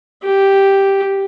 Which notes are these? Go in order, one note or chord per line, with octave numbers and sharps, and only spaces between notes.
G4